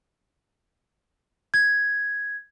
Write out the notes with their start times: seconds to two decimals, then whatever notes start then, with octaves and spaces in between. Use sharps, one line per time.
1.54 G#6